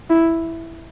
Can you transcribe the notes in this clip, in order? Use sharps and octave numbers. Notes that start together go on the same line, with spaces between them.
E4